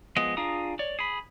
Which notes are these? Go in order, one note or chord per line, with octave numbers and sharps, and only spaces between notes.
F3 G#3 B3 G#4 D#5
D4 F4 G#4 A#5 D#6
C#5 D5
G#4 B5